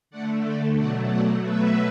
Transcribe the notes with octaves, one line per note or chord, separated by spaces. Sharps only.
D3 A3 D5 F#5
A4 D5
B2 F#3 A3 D5 F#5
D5 F#5
B2 F#3 A3 B4 E5